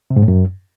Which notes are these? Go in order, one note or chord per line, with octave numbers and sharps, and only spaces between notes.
C3
G#2
A2
F#2